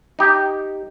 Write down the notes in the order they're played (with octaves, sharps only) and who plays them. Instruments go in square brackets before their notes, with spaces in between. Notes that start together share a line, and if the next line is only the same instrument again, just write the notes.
[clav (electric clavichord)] D#4 G4